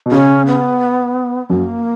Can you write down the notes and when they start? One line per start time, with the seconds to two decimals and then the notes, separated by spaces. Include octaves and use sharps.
0.06 B2
0.12 C#3 C#4
0.47 B3
1.50 F#2 F#3 A#3